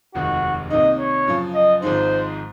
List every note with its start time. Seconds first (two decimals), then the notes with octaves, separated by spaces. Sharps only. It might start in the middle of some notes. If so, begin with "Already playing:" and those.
0.14 F1 D#2 D#3 G#3 F#4
0.70 C2 C3 D#3 A#3 D#4 D#5
0.99 C#5
1.27 F#2 C#3 F3
1.54 D#5
1.82 G#1 G#2 F3 G#3 D#4 C5